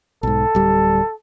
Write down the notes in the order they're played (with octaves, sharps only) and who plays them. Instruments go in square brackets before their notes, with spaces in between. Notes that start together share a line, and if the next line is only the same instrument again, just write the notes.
[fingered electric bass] B1 G#2 [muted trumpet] A4
[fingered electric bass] D1 G3